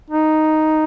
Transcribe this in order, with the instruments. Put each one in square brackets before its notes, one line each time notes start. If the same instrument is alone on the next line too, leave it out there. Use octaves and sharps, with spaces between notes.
[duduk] D#4